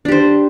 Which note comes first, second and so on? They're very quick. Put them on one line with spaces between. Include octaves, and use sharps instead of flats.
D4 G4 C5